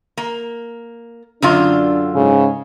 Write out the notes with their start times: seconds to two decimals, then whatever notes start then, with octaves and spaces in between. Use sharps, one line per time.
0.17 A#3
1.42 F#2 D3 D4 F4
2.15 G#2 C#3